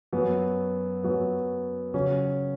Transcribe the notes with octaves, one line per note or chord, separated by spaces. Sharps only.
F#2 F#3 B3
F#2 F#3 B3
C#3 F#3 C#4